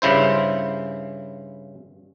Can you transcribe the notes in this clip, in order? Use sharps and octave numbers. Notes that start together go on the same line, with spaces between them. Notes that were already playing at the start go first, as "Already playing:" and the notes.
G2 C#3 E4 C5